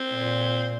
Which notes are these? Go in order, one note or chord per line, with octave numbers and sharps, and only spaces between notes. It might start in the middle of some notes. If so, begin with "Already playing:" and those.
Already playing: C4
A#2